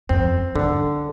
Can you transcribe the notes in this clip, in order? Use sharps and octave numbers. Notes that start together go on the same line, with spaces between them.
F2 C4
G2 D3